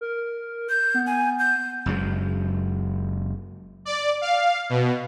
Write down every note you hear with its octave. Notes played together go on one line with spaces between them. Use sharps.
A#4
G6
B3
G#5
G6
F#1 F#2 F#3 G#3
D5
F5
B2